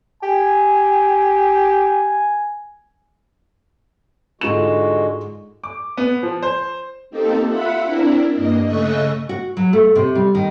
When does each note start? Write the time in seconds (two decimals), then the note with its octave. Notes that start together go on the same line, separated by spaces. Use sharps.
0.23 G4 G#5
4.41 G#2 D3 G#3 F4 F#4 E7
5.64 D6
5.97 B3
6.23 F3
6.42 C5
7.10 A#3 C4 D#4 G4 A4
7.46 F4 E5 F#5 B5
7.83 C4 D4 E4 A#4
8.33 G2 A#3 D#5
8.64 C#3 A3 D#5 C#6 E6 F#6
9.29 F#4
9.57 F#3
9.73 A3
9.96 C3
10.15 G3
10.35 D#3